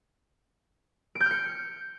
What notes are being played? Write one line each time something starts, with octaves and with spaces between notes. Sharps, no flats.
D7
G6
F6
C#7